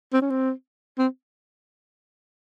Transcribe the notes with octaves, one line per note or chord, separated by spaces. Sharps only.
C4
C#4
C4
C4